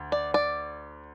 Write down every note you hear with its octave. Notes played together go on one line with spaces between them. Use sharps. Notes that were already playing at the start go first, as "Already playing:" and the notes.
Already playing: D2
D5
D5